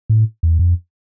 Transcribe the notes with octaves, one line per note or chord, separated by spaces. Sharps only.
A2
E2
F2